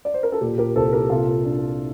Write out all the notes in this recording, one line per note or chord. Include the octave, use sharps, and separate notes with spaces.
D5
C5
A#4
A4
A#2 G4
G4 A#4
C2 A4 C5
G4 A#4
C3 F4 A4
D4